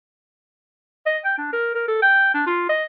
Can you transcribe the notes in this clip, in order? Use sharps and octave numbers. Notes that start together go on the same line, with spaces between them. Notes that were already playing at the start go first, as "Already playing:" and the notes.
D#5
G5
D4
A#4
A#4
A4
G5
D4
F4
D#5